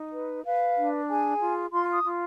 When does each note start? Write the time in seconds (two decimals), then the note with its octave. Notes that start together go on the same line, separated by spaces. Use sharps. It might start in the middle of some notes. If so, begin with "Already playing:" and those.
Already playing: D#4
0.12 B4
0.45 B4 F5
0.77 D4
1.08 G#4 G#5
1.40 F4
1.72 F4 C6
1.92 D#6
2.04 F4